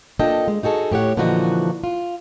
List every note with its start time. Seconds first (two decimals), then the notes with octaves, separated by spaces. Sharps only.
0.19 A#3 D4 F4 A4 D#5 G5
0.48 G#3
0.63 D#4 F#4 G#4 A4
0.92 A2 G4 C#5 F#5
1.17 A#2 D3 E3 F3 D#4 F#4
1.84 F4